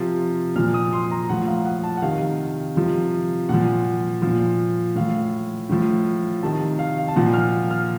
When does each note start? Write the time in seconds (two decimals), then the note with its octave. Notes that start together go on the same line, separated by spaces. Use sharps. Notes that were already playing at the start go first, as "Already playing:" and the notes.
Already playing: C3 F3
0.56 A#2 F3 F6
0.74 D#6
0.93 C6
1.11 A#5
1.29 A2 F3 F#5
1.48 F5
1.65 F#5
1.83 A5
1.97 F#5
2.02 C3 D#3 F5
2.76 C3 F3
3.49 A#2 F3 F#5
4.22 A#2 F3
4.95 A2 F3 F5
5.69 A2 F3
6.43 C3 D#3 A5
6.79 F5
6.98 F5
7.08 A5
7.16 A#2 F3 F#5
7.34 F6
7.71 F6